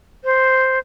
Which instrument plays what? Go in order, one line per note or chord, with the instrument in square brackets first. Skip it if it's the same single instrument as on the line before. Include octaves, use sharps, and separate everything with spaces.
[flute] C5